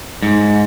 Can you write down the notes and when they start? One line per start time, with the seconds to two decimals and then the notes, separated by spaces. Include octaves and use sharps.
0.22 G#2